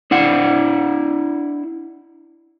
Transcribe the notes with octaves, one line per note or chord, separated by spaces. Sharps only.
D4 E4 F#5